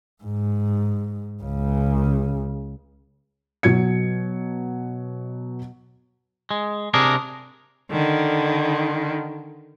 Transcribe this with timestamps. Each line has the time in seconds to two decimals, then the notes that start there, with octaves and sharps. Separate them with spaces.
0.24 G#2
1.43 C#2 C#3
3.63 B2 F#3 G#6 C#7
6.51 G#3
6.94 C3 D4 G#4 A#4
7.91 D3 D#3